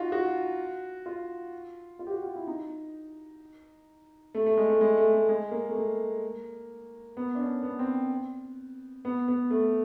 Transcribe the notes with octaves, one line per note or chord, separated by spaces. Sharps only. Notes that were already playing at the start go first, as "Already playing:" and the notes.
Already playing: D#4 F4 F#4
F#4
F4
F4
G4
F#4
F4
E4
D#4
A3
A3
G#3
A3
G#3
A3
A3
G#3
A#3
A3
A#3
B3
D4
C#4
B3
C4
B3
B3
A3